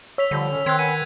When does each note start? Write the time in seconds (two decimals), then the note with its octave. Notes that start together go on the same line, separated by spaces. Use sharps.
0.18 C#5 E6 B6 F7
0.31 D3 F3 G3
0.51 C#4
0.66 D#3 C4 C6 F#6 G#6
0.79 B4 F#5 G#5 B6 D#7